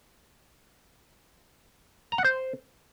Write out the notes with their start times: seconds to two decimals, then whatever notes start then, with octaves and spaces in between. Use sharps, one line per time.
2.12 A#5
2.18 F#5
2.25 C5